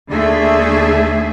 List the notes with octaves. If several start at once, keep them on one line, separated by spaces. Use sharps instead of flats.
D#2 D3 A3 G#4 E5